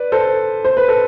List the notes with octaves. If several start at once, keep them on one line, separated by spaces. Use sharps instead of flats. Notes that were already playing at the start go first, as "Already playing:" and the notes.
Already playing: B4 D5
A4 C5
C5
B4
A4